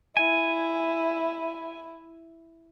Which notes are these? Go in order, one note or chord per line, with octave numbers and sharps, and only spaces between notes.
E4 G#5